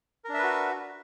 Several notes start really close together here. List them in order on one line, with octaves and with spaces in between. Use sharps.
A#4 D4 E5 B4 F#4